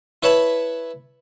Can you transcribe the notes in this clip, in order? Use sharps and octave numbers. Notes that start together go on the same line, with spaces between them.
E4 B4 C#5 E5 A5 B5